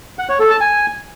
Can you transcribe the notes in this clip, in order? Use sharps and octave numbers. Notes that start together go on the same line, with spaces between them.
F#5
C#5
A4
A5
G#5